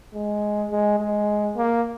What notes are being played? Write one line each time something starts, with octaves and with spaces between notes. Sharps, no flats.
G#3
G#3
G#3
A#3